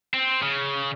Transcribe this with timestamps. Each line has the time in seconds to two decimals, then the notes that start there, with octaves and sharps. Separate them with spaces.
0.14 C4
0.42 C#3